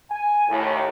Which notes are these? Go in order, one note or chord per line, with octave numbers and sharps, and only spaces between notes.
G#5
D#2 A2